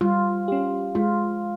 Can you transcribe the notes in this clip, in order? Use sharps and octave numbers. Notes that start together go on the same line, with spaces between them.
G3 F4
C#4 G4
G#3 F4